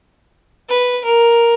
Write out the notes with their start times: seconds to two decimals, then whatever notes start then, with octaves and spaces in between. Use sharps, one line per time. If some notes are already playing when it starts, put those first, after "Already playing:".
0.69 B4
1.05 A#4